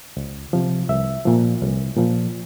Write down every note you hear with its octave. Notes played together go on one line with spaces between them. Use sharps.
C#2
C3 F3
C2 E5
A#2 F3
C2
A#2 F3